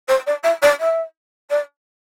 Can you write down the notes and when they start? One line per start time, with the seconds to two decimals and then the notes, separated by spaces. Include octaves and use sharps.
0.08 C5
0.26 D5
0.43 E5
0.62 D5
0.79 E5
1.50 D5